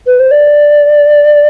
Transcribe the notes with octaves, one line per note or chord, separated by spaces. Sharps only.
B4
C5
D5